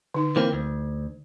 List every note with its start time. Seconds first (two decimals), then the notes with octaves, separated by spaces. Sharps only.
0.14 D3 D#4
0.36 E3 A#3 C4
0.52 D2